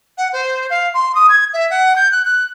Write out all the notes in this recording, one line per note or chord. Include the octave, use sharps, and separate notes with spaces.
F#5
C5
F5
C6
D#6
G#6
E5
F#5
G6
F#6
F#6